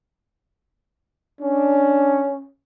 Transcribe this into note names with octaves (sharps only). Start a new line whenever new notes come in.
C#4 D4